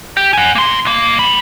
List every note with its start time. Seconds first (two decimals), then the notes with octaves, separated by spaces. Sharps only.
0.17 G4
0.33 F#5 G#5
0.55 A#3 C6
0.85 B1 A#3
1.19 G3 B5